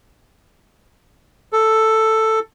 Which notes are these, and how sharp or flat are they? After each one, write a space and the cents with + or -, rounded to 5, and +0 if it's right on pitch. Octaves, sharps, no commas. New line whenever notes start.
A4 +5